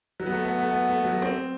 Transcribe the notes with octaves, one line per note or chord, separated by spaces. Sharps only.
F#3
B3
A3
B3
A3
B3
A3
F#3
C4